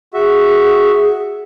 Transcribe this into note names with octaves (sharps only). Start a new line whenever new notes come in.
F#4 G#4 E5